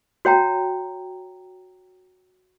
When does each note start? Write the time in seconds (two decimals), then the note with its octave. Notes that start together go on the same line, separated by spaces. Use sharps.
0.25 F#4 C#5 G5 A#5